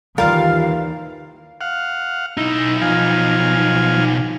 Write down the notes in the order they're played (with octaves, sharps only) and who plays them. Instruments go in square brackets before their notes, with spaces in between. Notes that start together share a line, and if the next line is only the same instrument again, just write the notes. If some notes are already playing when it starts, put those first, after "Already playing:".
[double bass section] D#2 D#3 E3 [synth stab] G3 F4 A6 [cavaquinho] A#4 [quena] F5
[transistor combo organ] F5 F#5
[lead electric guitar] B1 D#4 [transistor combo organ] E4
[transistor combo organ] F3 F5 G#5